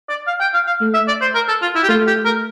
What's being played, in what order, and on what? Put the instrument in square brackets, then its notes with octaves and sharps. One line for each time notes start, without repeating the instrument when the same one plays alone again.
[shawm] D5
F5
G5
F5
F5
[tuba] A3
[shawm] E5
D5
C5
A#4
A4
F4
E4
G4
[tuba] A3 [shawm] F4
[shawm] G4
A#4